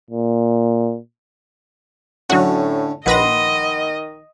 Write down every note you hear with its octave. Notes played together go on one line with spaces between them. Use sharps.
A#2
A2 D3 F#3 C#4 F#4
A#1 D#3 B4 D#5 F#5 B5 C6 A#6